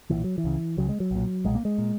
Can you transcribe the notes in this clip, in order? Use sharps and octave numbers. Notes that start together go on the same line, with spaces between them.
B1 A#2 E3
F#3
E3
C#2 C#3
C#2 C#3 F#3
G#3
F#3
B1 A#2
B1 A#2 G#3
A#3
G#3
A#2